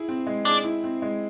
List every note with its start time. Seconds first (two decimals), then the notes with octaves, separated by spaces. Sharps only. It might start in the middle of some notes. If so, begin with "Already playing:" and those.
Already playing: E4 G#4
0.09 C4
0.27 G#3
0.45 D4 G#4
0.64 E4
0.84 C4
1.02 G#3